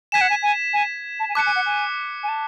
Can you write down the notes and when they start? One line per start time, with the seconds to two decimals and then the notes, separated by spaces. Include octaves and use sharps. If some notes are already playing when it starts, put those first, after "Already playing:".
0.12 G#5 G#6 B6 E7
0.21 F#5
0.30 G#5
0.43 G#5
0.73 G#5
1.20 A5
1.29 G#5
1.35 A5 D6 F#6 C#7
1.46 G#5
1.56 F#5
1.66 G#5
2.23 G#5
2.28 A5